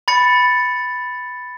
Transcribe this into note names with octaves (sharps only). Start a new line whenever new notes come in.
B5 A6 C#7